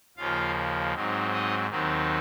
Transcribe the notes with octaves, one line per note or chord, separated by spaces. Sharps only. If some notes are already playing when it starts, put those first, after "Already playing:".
D#2 C#3 F3 A#3 F4 F5
G#2 F#3 C4 D#4
D#4 D#5
D#2 D#3 F#3 C4 D#4